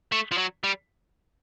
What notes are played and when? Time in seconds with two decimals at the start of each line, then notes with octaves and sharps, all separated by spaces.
0.12 A3
0.31 F3
0.38 F#3
0.64 G3